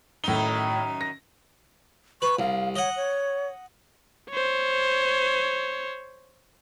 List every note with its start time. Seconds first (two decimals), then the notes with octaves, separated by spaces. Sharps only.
0.24 F#2 A2 D#3 D#4 G7
1.01 A#6
2.22 B4 C#6
2.39 C2 F5
2.76 C#5 D#5 F#5
2.96 C#5
4.30 C5 C#5